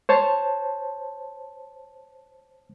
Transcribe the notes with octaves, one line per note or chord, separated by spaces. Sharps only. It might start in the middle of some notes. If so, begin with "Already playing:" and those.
C5 C#5 A5